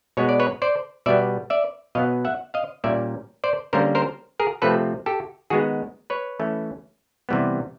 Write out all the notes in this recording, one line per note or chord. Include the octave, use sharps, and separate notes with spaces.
B2 G#3 B3 C#5
D5
B4 C#5
C5 D5
B2 G3 B3 D5 E5
D5 E5
B2 F#3 B3 D#5 F5
E5 F#5
D#5 F5
A#2 G3 A#3 C#4 D5 E5
C5 D5
D3 G3 A#3 C#4 A#4 C5
A#4 C5
G#4 A#4
C3 F3 A3 C4 A4 B4
G4 A4
D#3 G#3 B3 F#4 G#4
B4 C#5
E3 A3 C#4
C3 E3 G3 B3